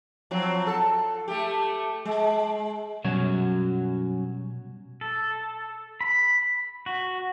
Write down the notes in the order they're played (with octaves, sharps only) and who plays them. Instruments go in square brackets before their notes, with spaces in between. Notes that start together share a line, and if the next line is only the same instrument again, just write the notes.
[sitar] F3 F#3 C4
A4
A3 G4
G#3
[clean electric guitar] F#2 F#3 C#5 [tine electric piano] B2 G3 G#6
[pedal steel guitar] A4
B5
F#4